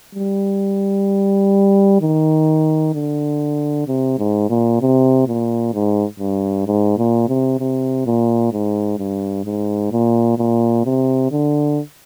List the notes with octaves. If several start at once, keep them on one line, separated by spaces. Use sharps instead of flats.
G3
D#3
D3
C3
G#2
A#2
C3
A#2
G#2
G2
G#2
A#2
C3
C3
A#2
G#2
G2
G#2
A#2
A#2
C3
D3